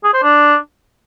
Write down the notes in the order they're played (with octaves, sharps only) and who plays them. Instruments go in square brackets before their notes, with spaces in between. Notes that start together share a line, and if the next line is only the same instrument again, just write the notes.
[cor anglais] G#4
C5
D4